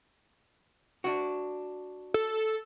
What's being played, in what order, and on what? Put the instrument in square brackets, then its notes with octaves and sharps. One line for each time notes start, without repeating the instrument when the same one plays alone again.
[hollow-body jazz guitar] D4 F#4
[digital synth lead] A4